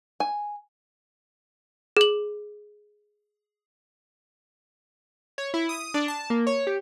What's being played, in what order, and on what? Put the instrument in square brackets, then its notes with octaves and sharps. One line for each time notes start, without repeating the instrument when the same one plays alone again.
[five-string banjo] G#5
[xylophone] G#4 F#7
[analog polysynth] C#5
E4
D#6
D4
A5
A#3
C#5
G4